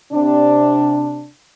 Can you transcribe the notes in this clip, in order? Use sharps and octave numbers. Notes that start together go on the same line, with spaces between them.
C3 D4